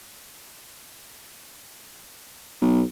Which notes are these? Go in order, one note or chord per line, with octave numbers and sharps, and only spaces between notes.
B1